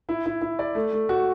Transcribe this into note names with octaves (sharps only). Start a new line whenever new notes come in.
E4
E4
E4
D5
A3
A3
F#4